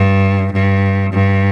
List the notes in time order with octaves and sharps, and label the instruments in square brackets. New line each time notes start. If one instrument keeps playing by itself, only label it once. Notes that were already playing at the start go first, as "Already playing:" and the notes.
Already playing: [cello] G2
G2
G2